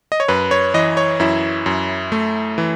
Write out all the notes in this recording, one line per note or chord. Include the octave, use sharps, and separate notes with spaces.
D#5
C#5
F#2 B4
C#5
E3 D#5
C#5
F#2 E4
F#2
A3
E3